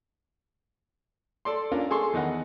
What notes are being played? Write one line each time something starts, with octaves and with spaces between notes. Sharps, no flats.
A4 D5 C6
A#3 C#4 D4 F4 A#4
G#4 A4 C6 C#6
E2 D#3 D#4 F#5